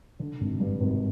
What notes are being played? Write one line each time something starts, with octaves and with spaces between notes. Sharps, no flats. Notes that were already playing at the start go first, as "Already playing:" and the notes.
D3
G#1
G2
G#1